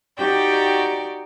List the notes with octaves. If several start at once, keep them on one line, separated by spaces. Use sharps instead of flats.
D#4 F#4 G4 D5 G5